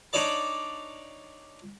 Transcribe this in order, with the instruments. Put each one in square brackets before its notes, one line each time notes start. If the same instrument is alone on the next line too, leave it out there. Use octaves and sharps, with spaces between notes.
[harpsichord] D4 D#4 C#5 D5 A5